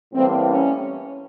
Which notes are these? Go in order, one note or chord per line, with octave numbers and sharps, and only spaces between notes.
A2 E3 G3 A#3 C4
C#4